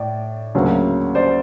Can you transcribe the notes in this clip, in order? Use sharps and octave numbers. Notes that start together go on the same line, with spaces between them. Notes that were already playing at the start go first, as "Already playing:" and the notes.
Already playing: A2 D5
D2 C#3 F#3 A#3
C5 D5